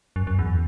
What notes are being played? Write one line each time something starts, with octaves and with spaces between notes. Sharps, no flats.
F#2
F#2
E2